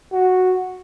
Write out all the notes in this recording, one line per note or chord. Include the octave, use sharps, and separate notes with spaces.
F#4